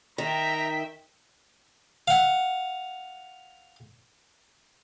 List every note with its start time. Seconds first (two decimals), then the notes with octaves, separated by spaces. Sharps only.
0.18 D#3 E5 G5 A#5 B6
2.08 F5 F#5